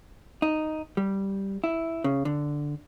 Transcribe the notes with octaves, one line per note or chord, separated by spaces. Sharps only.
D#4
G3
E4
C#3
D3